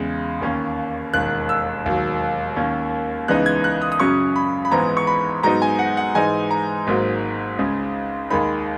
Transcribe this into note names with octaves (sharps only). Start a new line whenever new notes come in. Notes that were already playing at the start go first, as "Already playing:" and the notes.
Already playing: E2 C#3 G#3
D#2 D#3 A#3 C#4
E1 D#2 D#3 F#6
E6
E1 D#2 D#3 F#3
D#2 D#3 A#3 C#4
C#2 C#3 E3 B3 D#4 F#6
G#6
F#6
D#6
D#6
F#2 C#3 F#3 C#4 C#6
B5
B5
G#1 G#2 E3 G#3 B3 A#5
C#6
B5
G#2 F#3 B3 D#4 A#5
G#5
F#5
F#5
G#2 E3 G#3 D#4 G#5
A#5
G#1 G#2 F#3 A#3
C#2 C#3 G#3
D#2 D#3 G#3 D#4 B5